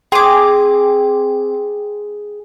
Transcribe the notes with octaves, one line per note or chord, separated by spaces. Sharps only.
C4 G#4 G5 D6